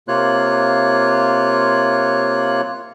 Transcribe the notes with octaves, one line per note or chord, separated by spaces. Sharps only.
C3 A#3 F4 C#5 F#6